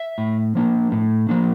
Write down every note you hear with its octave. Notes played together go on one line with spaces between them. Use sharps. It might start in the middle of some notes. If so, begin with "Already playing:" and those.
Already playing: E5
A2
F3 A#3 D4
A2
F3 A#3 D4